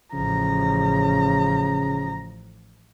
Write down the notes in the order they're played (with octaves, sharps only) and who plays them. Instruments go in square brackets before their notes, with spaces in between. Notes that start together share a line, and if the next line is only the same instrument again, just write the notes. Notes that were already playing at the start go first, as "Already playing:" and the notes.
[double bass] A1 F3 [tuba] C#3 [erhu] A#5